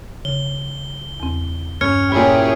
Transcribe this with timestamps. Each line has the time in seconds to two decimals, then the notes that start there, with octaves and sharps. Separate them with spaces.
0.25 C#3 G7
1.20 E2 C4
1.81 G2 C#4 F6 G#6 C#7
2.12 A#2 E4 G4 G#4 C#5 F6